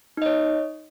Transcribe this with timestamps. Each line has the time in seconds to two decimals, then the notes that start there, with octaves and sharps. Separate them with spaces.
0.17 D#4
0.22 D#5
0.26 C#5